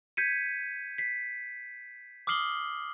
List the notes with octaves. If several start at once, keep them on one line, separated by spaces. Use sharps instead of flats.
G6 G#6 B6 C#7 D#7
B6 C7
D6 D#6 F6 C7 F#7 G7